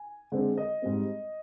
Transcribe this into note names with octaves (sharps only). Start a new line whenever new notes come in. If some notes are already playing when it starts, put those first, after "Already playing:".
Already playing: G#5
D3 G#3 C4
D#5
G#2 G3 C4